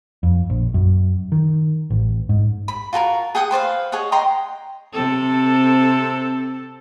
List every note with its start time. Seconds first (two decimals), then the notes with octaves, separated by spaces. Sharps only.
0.23 F2
0.50 A#1
0.74 F#2
1.32 D#3
1.90 A1
2.29 G#2
2.68 B5
2.93 F4 F#4 A4 A#4
3.35 G#4 F#5 G5 D#6
3.51 B4 C5 D5 F5
3.92 G#4 C#5 D#5 F#5
4.12 D#5 G5 A#5 C6
4.93 C3 C4 A4